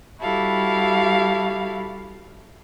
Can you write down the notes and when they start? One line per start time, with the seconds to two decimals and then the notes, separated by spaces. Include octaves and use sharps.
0.21 G3 E4 F#4 G4 A4 F5